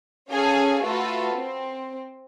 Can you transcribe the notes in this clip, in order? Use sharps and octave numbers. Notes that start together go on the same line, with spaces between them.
C#4 G#4 A4 F5 G#5
A3 F4 F#4 A4 B4
C4